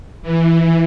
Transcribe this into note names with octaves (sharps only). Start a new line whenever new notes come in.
E3